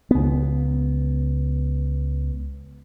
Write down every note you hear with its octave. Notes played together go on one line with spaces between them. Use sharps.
C#2 B3